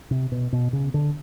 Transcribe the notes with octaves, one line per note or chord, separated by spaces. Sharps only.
C3
B2
B2
C#3
D3